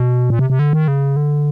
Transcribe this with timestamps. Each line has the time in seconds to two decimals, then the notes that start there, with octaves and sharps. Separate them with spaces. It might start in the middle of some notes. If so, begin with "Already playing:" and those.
Already playing: B2
0.30 A#2
0.39 C3
0.50 C3
0.59 D3
0.73 D#3
0.88 C#3
1.16 D3